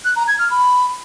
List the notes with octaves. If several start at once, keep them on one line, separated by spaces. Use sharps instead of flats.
F#6
A#5
G#6
F6
B5